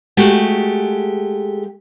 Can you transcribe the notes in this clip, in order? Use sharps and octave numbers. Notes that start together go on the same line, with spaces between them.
G#3 A3 F#4 G4